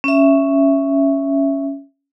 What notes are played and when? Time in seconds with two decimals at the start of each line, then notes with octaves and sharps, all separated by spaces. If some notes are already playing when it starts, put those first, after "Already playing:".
0.04 C#4 E5